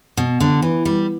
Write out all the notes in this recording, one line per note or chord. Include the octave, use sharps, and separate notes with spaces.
B2
D3
E3
G3